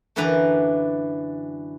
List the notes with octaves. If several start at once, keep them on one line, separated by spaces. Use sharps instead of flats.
F#2 D3 E3 D4 B4 A#5